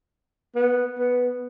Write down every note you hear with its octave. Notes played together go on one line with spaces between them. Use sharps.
B3
B3